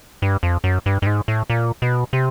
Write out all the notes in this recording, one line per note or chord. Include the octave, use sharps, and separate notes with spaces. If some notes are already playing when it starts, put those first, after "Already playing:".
G2
F2
F#2
G2
G2
G#2
A2
A#2
B2
C3